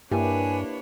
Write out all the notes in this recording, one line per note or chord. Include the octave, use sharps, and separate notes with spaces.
G2 A#3 D4 E4 G4 B4 C#5 G#5